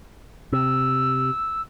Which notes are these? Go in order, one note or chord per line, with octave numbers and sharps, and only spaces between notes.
C3 E6